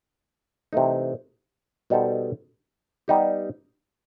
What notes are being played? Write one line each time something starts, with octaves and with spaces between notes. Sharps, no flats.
C3 E3 A3 D#4
B2 G3 D#4 A4 C5
G3 B3 D#4 G4